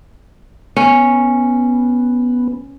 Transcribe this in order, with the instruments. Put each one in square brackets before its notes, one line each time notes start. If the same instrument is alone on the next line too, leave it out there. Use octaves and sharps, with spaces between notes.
[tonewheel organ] B3 [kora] C#4